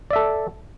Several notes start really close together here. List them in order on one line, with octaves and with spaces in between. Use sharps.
D5 E5 A4